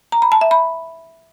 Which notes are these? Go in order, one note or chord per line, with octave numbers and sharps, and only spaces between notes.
A#5
B5
A5
E5
B5